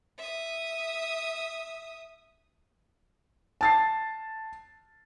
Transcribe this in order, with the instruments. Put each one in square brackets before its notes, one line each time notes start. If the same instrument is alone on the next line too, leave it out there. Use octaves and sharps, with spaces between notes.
[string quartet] E5 D#6
[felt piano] A5 A6 C7